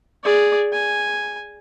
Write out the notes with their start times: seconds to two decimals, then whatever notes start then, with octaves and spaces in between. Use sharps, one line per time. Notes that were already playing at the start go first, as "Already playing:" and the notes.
0.24 G#4 D5
0.73 G#5